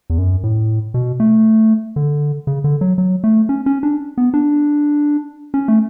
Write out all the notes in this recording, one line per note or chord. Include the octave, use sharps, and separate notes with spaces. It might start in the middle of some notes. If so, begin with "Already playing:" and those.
E2
F#2
A2
B2
A3
D3
C#3
D3
F#3
F#3
A3
C#4
C#4
D4
B3
D4
C#4
A3